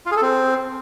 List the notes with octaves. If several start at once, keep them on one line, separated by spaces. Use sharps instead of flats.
F4
G#4
A4
C4